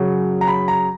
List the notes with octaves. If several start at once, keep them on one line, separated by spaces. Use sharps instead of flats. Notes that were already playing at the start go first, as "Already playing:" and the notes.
Already playing: F#2 C#3 F#3
A#5
B5
A#5